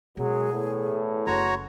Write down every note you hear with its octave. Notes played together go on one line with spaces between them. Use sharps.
F#2 B2 F#3 G#3 G#4
E2 A2
F#1 F#4 C#5 A#5 C6